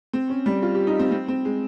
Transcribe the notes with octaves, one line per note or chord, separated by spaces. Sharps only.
C4
C#4
G3
F4
G4
D#4
C4
C4
C4
G#3